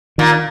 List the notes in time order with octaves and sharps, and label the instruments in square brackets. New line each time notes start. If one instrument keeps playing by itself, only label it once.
[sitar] A#2 [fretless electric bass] D#3